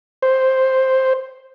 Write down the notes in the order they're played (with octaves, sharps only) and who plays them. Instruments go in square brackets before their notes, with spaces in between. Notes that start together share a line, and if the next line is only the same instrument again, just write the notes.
[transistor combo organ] C5